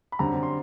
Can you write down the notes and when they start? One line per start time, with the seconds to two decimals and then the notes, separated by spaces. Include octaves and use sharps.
0.12 B5
0.19 F#2 D3 G3 C4 A#5
0.43 C6